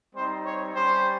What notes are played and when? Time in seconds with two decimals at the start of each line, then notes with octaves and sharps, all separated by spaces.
0.15 G3 C4 D#4 C5
0.46 C#5
0.75 G3 C#4 G4 C5